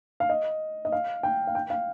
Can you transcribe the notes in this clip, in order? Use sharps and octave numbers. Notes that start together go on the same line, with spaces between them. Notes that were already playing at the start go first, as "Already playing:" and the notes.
F5
D#5
D#5
F5
G5
F5
G5
F5